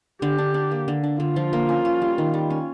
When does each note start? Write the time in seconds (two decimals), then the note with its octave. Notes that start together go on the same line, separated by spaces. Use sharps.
0.22 D3 G4
0.38 D4
0.54 D4
0.71 A#3
0.88 D3
1.03 D4
1.20 D3 F4
1.36 F3
1.53 A#3
1.69 C#4
1.85 C#4
2.02 G3
2.18 D#3
2.34 G3
2.50 C#4